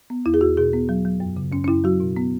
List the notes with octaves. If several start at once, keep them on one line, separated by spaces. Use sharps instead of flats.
B3
E2 E4
G#4
E2 F#4
B2 G#4
B3
F#3
F#3
F#2
C#3
F#2 C#4
C#4
F#2 E4
F#3 F#4
B2
B3